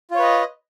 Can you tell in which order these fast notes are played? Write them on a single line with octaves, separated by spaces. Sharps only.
F4 C#5 B4 D#5